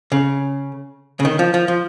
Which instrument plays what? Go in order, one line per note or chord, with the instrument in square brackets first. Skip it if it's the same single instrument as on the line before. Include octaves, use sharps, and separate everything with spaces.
[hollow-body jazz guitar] C#3
C#3
D#3
F3
F3
F3